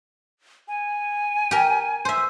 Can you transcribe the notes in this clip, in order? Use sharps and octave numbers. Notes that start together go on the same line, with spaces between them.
G#5
G4 A#4
C5 E5